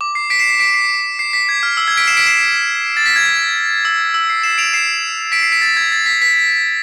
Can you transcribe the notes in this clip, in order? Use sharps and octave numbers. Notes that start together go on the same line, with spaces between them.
D6
C7
B6 D7
C7 E7
C7
B6 D7
C7
C7
B6
G#6
F6
E6
G#6
B6 D7
C7 E7
B6 D7
C7 E7
A6
B6
G#6
E6
E6
C7
C7 E7
D7 F7
C7 E7
B6 D7
C7
B6 D7
A6
G#6
A6
B6
B6